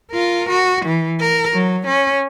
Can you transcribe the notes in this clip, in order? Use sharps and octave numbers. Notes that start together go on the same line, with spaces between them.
F4 A#4
F#4
E3
A#4
F#3
C#4